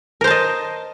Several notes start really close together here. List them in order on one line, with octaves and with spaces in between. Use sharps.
A#4 C5 A5 D#5